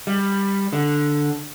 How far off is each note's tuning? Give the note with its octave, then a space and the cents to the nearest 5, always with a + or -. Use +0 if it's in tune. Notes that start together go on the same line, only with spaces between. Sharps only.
G3 +10
D3 +0